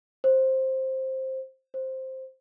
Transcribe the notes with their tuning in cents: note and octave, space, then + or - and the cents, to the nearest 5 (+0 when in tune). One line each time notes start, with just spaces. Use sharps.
C5 +10
C5 +5